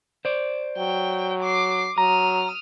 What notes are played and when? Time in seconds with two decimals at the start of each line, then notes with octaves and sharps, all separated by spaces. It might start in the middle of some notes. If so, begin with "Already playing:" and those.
0.25 C5 D5
0.78 F#3 G5
1.43 D6 C7
1.98 F#3 A#5 D#6 F6